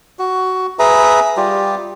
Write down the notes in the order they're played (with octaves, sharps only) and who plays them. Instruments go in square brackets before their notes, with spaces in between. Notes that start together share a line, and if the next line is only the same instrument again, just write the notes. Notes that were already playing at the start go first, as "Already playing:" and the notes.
[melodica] F#4
G#4 B4 E5 A#5
G3 F4 G4